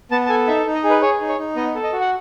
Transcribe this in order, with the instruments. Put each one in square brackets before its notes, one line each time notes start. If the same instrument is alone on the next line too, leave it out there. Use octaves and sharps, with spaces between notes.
[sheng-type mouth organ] B3 A5
A5
A4 G#5
D#4 E5
D#4
D#5
G#4
B4
G#4 C#5
D#4
C#5
D#4
B3 D#5
A4
D#5
F#4
F#5